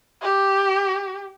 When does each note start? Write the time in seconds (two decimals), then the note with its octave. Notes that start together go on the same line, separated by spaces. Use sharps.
0.22 G4